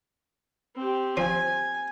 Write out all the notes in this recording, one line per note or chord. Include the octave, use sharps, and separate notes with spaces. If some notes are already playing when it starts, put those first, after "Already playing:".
C4 G4
F3 G#5